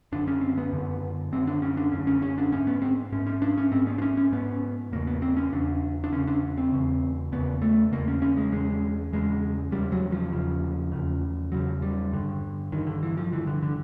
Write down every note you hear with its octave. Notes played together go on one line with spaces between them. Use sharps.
F#2 D3 D4
C#4
C4
B3
F#2 D3
F#2 D3 C4
D4
C#4
D4
F#2 D3 C#4
C#4
C#4
D4
G#2 C#4
B3
C4
G#2 C#4
C#4
D4
C#4
G#2 C4
B3
D4
C#4
C#4
G#2 B3
E2 C#3 A#3
B3
C4
C#4
E2 C#3 D4
D4
E2 C#3 C#4
D4
C4
E2 C#3
E2 C#3 B3
A3
E2 C#3 A#3
C#4
C#4
G#3
E2 C#3 G#3
E2 C#3 G#3
E2 C#3 G3
F#3
F3
E2 C#3
E2 C#3
E2 C#3 F#3
G3
G2 D3
G2 D3 D#3
D3
E3
F3
G2 D3 E3
D3
D3